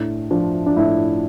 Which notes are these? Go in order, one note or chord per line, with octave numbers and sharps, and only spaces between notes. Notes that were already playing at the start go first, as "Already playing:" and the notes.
Already playing: A2 D4
F3 D4
D4
A2 E4